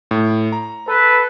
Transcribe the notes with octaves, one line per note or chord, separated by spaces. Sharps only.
A2
A#5
A4 B4